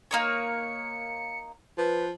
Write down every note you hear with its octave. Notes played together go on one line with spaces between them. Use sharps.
A#3 D#4 C#5 C#7
F3 B4